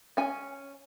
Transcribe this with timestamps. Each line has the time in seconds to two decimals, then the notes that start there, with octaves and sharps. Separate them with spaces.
0.17 C#4 G#5